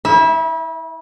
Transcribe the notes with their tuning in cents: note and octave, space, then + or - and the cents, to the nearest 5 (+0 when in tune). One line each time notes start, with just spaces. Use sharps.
E4 -35 E5 +0